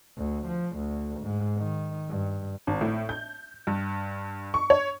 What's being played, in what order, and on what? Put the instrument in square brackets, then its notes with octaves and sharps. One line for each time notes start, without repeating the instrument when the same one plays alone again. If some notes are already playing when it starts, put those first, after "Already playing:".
[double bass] D2
F3
D2
G#2
D#3
G2
[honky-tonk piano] G#1
A2
G6
G2
C#6
C#5